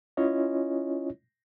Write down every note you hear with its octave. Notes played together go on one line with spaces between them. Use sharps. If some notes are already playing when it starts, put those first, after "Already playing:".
C#4 E4 F4 C#5 D#5